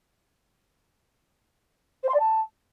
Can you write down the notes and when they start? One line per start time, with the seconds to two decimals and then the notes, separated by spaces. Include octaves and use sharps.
2.03 C5
2.09 C6
2.14 D5
2.20 A5